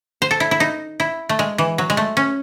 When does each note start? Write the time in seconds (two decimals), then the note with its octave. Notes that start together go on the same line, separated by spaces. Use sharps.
0.22 C5
0.31 A4
0.40 E4
0.51 E4
0.60 D#4
1.00 E4
1.29 A3
1.39 G#3
1.58 E3
1.78 F#3
1.90 G#3
1.97 A3
2.17 C#4